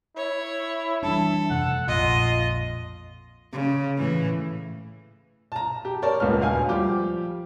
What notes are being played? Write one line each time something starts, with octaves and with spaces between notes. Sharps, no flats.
E4 C#5
E3 G3 D4 A4
F2 C3 A3 F#5
A#1 F2 A#2 F4 D#5
C#3
A2 E3
A5 A#5
G4
A#4 C#5 D5 A5
D#1 C#2 B3 F6
D2 F5 G#5 F6
F3 G3 G4 D6